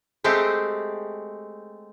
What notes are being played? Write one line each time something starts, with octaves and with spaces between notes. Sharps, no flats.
G#3 A3 C4 G4